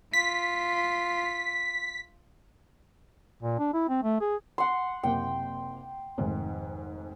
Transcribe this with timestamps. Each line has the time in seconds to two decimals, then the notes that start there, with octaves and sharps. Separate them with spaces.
0.13 F4 B6
3.43 A#2
3.59 D4
3.73 E4
3.89 C4
4.03 A3
4.21 G#4
4.58 F#5 C6
5.03 F#1 C3 A#3 G5
6.18 F1 G#2 D#3